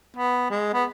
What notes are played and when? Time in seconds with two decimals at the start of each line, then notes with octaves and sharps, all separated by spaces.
0.17 B3
0.50 G#3
0.73 B3